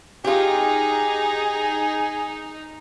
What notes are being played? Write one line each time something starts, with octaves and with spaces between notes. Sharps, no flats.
D#4 F4 G4 G#4